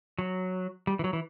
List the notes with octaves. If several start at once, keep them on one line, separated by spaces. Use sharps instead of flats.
F#3
G3
E3
F#3
E3